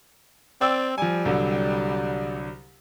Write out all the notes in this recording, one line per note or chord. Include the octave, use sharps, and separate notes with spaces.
C4 D5 G5 E6
F3 G3 G#5
C2 D3 F#3